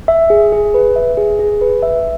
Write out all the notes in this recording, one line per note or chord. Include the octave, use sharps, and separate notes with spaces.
E5
G#4
G#4
B4
E5
G#4
G#4
B4
E5